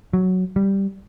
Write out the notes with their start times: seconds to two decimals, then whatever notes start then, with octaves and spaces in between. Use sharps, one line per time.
0.13 F#3
0.56 G3